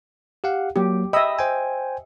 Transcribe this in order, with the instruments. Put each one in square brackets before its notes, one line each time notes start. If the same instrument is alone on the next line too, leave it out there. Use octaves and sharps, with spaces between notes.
[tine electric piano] G4 F5 F#5
[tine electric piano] F#3 A#3 [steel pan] G4
[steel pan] D#5 E5 [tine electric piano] G5 B5 E6
[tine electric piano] C5 G5 G#5